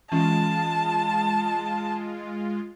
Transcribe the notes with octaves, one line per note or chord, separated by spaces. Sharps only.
E3 G#3 C#4 F4 A5